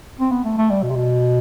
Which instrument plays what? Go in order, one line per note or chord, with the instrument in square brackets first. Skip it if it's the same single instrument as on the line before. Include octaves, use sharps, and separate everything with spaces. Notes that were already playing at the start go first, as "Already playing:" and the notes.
[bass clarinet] C4
B3
A3
A3
G3
B2
C3
B2